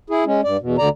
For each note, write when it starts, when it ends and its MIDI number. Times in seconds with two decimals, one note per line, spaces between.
0.10 0.24 64
0.10 0.24 68
0.26 0.41 56
0.26 0.41 61
0.44 0.57 43
0.44 0.57 74
0.61 0.76 40
0.61 0.76 47
0.78 0.89 38
0.78 0.89 50
0.78 0.89 74
0.78 0.89 82